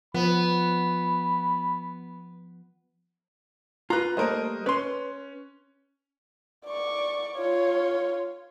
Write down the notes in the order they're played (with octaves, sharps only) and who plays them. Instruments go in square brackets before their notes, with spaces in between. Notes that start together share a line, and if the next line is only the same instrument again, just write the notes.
[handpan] F3 [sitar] B3 [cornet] B5
[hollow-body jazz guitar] F4 B4 [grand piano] A#5 F#6
[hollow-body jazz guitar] G3 A3 A#3 [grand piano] A#4 C5 D#5
[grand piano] C#4 [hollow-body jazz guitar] B4 C6
[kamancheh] D5 C#6
F4 C#5